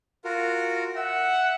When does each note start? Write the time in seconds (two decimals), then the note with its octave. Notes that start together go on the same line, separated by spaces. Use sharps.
0.25 F4 F#4 A#4
0.95 E5 F#5